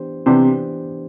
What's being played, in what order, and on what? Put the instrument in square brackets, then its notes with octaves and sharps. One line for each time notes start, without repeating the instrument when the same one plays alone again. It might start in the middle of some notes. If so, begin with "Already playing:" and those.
Already playing: [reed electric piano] E3 B3 D4 G4 C5
[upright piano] C3 [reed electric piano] E3 B3 D4 G4 C5